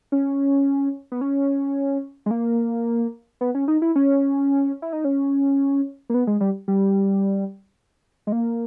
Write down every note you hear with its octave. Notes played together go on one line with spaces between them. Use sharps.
C#4
B3
C#4
G#3
A#3
B3
C#4
D#4
E4
C#4
E4
D#4
C#4
A#3
B3
G#3
G3
G3
G#3
A#3